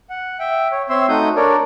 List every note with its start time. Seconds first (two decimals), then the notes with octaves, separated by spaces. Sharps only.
0.10 F#5
0.39 E5 G5
0.72 C#5
0.89 C4 C#5 E5 C6 E6
1.09 A3 D#4 F#4 D#6 G6
1.36 D4 A#4 C#5 D5